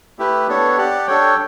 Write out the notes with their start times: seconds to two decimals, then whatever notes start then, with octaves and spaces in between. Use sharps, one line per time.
0.19 A3 E4 G4 B4
0.48 B3 D4 A4 C#5
0.78 G4 D5 F#5
1.07 D4 A4 C#5 G5